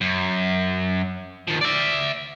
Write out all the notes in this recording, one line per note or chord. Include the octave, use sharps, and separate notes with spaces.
F#2
D#3 F3
D5 E5